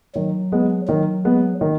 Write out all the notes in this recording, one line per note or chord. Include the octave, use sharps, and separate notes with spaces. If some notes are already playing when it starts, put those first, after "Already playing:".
D#3 F#3
G#3 B3
D#3 F#3
G#3 B3
D#3